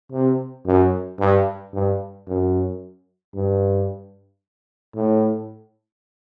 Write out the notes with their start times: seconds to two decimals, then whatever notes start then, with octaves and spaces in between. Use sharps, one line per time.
0.12 C3
0.66 F#2
1.20 G2
1.73 G2
2.27 F#2
3.34 G2
4.95 A2